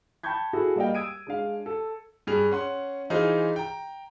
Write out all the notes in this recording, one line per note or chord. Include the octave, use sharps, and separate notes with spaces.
G5 A5 B5 C#6 G6 G#6
E4 F#4 G#4 A4
G3 A#3 D5 D#5 F5 G5
D#6 E6 G#6 D7 D#7
G#3 D4 F5
A4
G2 G#4 F7
C#4 F#5 C6
E3 D#4 F4 G#4 C5
G5 A#5